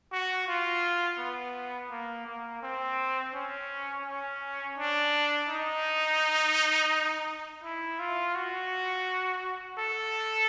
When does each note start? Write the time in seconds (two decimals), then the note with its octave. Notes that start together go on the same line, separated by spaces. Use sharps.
0.12 F#4
0.48 F4
1.19 B3
1.91 A#3
2.27 A#3
2.62 C4
3.34 C#4
4.06 C#4
4.78 D4
5.49 D#4
7.64 E4
8.00 F4
8.35 F#4
9.78 A4